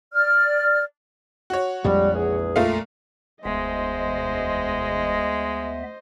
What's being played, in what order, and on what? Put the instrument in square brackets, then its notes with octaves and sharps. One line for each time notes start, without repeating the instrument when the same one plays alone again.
[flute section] D5 F6
[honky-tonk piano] F#4 C#5
[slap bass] A#1 F2 G#3 [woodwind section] G3
[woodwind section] E2 G#4
[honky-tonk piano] A#2 A3 F5
[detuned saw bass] E1 [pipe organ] D2 B3 E5 [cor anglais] G#3 [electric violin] C5 D#5